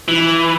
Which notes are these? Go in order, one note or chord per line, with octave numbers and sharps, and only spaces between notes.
E3